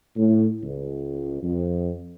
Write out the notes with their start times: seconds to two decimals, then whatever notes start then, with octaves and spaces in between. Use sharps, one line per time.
0.16 A2
0.63 C#2
1.43 F2